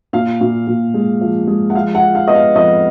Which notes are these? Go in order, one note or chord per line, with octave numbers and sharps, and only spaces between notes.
A#2 F5
A#2
A#2
G#3
F3
G#3
F#5
F3 F5
F#5
F3
F5
B3 D#5
F5
F2 D#5